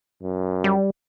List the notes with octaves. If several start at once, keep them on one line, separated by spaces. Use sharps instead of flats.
F#2
G3